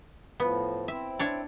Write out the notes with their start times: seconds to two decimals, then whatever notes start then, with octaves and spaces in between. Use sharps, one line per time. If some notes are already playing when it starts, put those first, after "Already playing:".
0.40 A2 F3 B3
0.88 C4 E4 E5
1.19 D4 C#5 D5